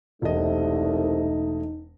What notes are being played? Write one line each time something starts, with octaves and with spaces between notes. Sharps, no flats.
E1 C2 A3 D#4 D#5